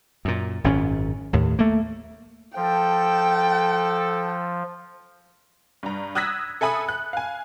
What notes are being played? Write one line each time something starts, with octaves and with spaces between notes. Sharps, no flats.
F#2 A#2
G#1 F#2 A#2 C#4
D#2 A2
A3 A#3
F3 A4 G5
G2 A#5
D#6 E6 F#6 G#6 A#6 B6
A4 E5 G#5 B5 D#6
F#6
F5 G#5